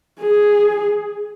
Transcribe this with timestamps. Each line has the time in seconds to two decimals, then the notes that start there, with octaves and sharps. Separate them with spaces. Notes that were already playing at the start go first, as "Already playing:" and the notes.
0.21 G#4